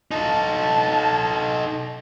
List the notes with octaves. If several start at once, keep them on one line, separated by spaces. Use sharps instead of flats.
D#4 A4 A5